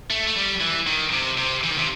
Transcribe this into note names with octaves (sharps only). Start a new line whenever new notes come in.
A3
A3
G3
E3
D#3
C3
C3
E3
D#3
C3